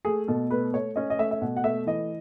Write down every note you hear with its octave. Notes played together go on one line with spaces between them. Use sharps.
A3 G#4
B2 A4
A3 B4
A3 C#5
C#4 D#5
D#5
A3 E5
E5
B2 F#5
F#5
A3 E5
E3 D#5